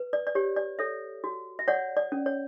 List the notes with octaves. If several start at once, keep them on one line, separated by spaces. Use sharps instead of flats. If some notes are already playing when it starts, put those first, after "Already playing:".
Already playing: B4
D5
D5
G4 C#5
D5
A4 C#5 E5
F#4
E5
C#5 D5 F#5
D5
C#4
C#5